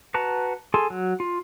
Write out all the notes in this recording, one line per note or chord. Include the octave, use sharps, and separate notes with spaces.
F#4 B4 A5 A#5
G#4 A4 G#5 A5 C6
F#3
F4